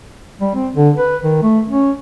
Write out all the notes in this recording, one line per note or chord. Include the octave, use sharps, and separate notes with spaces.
G3
C4
D3
B4
D#3
A3
C#4